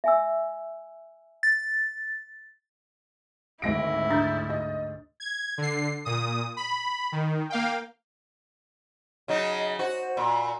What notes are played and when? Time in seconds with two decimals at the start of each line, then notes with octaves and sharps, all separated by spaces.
0.04 E5 G#5 E6
1.43 A6
3.62 G#1 D2 G#2 E4 A#6 D7
4.11 D4 D#6 G6 A6
4.50 D#5
5.20 G#6
5.58 D3 C7
6.05 A#2 D#6
6.57 B5
7.12 D#3
7.50 A#3 F5 G5
9.28 C#3 F#3 D#4 D#5
9.79 F#4 C5
10.17 A#2 B5